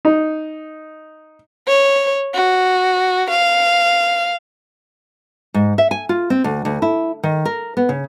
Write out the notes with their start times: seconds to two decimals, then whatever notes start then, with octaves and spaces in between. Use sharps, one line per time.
0.05 D#4
1.67 C#5
2.34 F#4
3.30 F5
5.54 G#2
5.78 E5
5.91 G#5
6.09 F4
6.30 C4
6.44 D2
6.65 D2
6.82 E4
7.23 D#3
7.45 A#4
7.77 B3
7.89 C#3